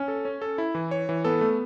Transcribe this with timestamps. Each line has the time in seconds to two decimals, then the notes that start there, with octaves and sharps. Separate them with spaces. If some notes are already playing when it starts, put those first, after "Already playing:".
Already playing: C#4
0.08 A4
0.25 C#4
0.42 A4
0.58 E4
0.75 E3
0.91 C#5
1.09 E3
1.24 B3 A4
1.41 A3